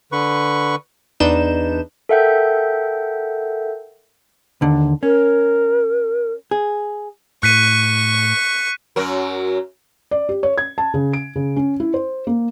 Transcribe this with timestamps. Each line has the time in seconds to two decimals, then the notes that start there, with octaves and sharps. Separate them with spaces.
0.12 D3 B4 C#6
1.20 E2 D4 D#4 B4 G6 E7
2.09 A4 A#4 E5 F#5 G5 G6
4.61 D#2 D3
5.03 C#4 A#4
6.51 G#4
7.43 A2 C#6 F#6 B6 D#7
8.96 F#2 F#3 A#4
10.11 D5
10.29 G4
10.43 C#5
10.58 G#6
10.78 A5
10.94 C#3
11.13 D7
11.36 C#3
11.56 C#4
11.80 E4
11.94 C5
12.27 A#3